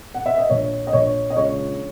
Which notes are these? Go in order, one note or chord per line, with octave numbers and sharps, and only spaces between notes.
F#5
E5
D#5
A#1 C#5
D#5
A#1 C#5
D#5
C#2 C#5